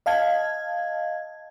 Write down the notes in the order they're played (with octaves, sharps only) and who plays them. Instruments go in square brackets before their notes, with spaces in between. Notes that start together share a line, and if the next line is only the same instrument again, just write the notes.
[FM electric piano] D#5 F5 A5 G#6